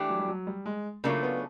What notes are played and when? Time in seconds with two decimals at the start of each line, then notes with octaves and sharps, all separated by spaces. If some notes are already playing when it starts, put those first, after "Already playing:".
Already playing: E3 A3 D4 G4
0.09 F#3
0.19 G3
0.28 F#3
0.47 G3
0.66 G#3
1.04 C#3 F#3 A3 A#3 D4 F4
1.23 B3